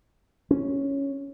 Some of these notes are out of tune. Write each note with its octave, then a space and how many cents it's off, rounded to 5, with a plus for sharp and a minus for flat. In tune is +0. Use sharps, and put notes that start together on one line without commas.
C#4 +0